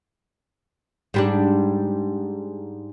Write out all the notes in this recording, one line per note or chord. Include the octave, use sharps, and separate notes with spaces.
G#2 G3 D4